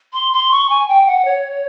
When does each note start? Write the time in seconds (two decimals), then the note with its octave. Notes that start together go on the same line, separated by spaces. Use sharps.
0.13 C6
0.33 C6
0.51 C#6
0.70 G#5
0.88 G5
1.06 F#5
1.25 C#5